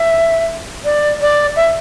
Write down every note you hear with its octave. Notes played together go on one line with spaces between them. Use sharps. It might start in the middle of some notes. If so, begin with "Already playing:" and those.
Already playing: E5
D5
D5
E5